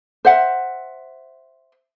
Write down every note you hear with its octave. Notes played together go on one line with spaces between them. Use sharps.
C5 E5 F#5